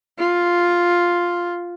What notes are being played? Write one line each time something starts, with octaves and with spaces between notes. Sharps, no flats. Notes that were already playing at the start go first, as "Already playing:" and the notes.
F4